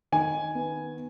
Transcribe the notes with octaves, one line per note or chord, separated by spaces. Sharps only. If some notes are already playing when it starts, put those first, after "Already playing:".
D#3 G#5
B3